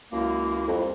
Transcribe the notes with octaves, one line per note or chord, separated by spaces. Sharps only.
C#2 F#2 A#3 E4
C2 F2